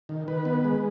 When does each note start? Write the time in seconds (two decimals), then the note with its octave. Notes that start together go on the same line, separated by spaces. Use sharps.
0.09 D#3
0.28 D#3 B4
0.45 B3
0.64 G#3